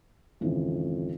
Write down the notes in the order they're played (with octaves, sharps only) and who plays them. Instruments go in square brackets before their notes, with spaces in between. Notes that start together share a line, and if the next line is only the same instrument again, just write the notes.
[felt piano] G#1 C#3 E3 [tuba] F2